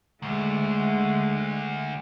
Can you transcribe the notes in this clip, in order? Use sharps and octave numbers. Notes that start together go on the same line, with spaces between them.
D2 G#3 A3